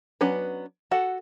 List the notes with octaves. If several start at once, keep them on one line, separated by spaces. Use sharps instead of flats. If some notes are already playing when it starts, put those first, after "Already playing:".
F#3 B3 C#4 D4 B4
F#4 A4 F#5